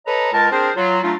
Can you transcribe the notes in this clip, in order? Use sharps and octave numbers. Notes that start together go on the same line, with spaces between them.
A4 B4 C#5 D#5 A#5
C#2 A#4 A5
C4 D4 G#4 A#4 C5
F#3 F4
F#3 A3 D4 D#4 F4